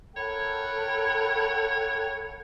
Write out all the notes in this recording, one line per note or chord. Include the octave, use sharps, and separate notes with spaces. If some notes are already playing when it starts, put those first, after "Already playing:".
E4 A4 A#4 C#5 F#5 G5